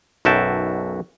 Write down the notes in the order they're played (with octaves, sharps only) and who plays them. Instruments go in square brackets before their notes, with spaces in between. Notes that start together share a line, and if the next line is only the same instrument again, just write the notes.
[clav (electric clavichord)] B1 F#2 F#4 E5 G5 A5